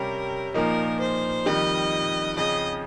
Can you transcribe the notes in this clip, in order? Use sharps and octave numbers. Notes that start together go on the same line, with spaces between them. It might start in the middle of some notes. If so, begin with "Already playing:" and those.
Already playing: C3 G3 C#4 A#4
A#2 F3 A#3 D#4 A#4
C5
F2 D#3 G3 D#5
F2 C#3 F3 D#5